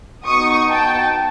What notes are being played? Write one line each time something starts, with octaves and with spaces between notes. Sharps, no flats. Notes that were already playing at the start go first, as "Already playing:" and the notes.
B3 D#4 F#4 C#6 D#6
G5 A5